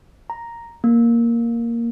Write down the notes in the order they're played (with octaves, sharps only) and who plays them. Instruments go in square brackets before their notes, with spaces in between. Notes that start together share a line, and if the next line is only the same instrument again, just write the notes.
[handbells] A#5
A#3